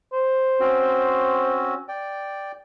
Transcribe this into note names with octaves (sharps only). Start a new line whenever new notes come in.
C5
C4 C#4 F#4
D5 G5